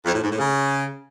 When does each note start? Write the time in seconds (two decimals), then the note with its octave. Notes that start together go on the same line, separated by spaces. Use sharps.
0.06 F2
0.14 A2
0.22 G#2
0.31 A2
0.39 C#3